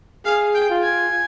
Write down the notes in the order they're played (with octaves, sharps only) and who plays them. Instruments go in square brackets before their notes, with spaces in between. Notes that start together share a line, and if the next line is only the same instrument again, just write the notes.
[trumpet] G#4 [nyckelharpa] F5
[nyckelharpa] G5
[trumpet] F4
[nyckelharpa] G#5